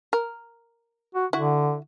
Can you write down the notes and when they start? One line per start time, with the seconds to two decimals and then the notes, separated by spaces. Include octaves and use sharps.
0.13 A#4
1.15 F#4
1.33 D3 E4 F#4